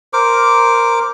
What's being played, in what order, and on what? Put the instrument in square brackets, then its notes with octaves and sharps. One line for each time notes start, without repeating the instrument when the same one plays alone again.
[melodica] A#4 C5 D6